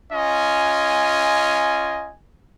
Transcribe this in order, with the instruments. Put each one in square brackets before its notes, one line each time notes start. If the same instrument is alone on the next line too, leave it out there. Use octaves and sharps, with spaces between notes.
[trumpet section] C#4 F4 D#5 G#5